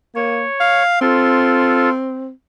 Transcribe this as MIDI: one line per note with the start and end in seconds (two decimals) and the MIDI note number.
0.15 0.44 58
0.15 0.83 73
0.60 0.97 77
1.01 2.30 60
1.01 1.89 65
1.01 1.89 69